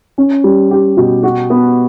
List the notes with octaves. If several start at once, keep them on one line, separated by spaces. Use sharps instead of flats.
C#4
G3
G4
B2
F#4
B3